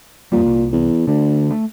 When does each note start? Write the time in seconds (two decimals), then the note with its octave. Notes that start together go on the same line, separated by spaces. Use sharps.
0.32 F2 A#2 F3 G3
0.46 C2
0.73 E2
1.07 D2 D3
1.50 A3